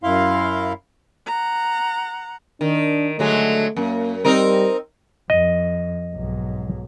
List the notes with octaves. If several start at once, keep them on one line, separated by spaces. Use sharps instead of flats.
F#2 E4 F5 C6
F#5 A#5
D#3 D4
D3 F#3 G#3 A3
F#2 A#3
G3 C4 D#4 A#4
F2 D#5
B1 G#2